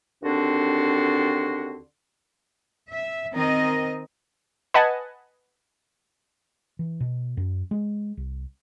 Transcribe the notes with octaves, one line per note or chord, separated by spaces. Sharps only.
D#2 D3 C4 D4 F#4 C6
E5
D#3 C4 A#4 D#5
B4 D#5 F#5 G#5 A5
E3
B2
F#2
G#3
C2